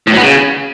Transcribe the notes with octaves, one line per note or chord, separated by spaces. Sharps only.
A2
F#3
B3
C#3